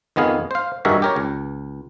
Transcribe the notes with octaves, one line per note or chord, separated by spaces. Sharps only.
F2 D#3 B3 G#4 F5
C5 F5
G2 D#3 F#4 G#4 A#4 E5
G4 A#4 C#5
C#2